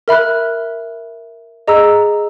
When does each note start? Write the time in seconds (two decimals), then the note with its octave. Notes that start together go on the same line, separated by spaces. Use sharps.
0.08 A#4 E5 B5 F#6
1.68 G#4 D#5 A#5 E6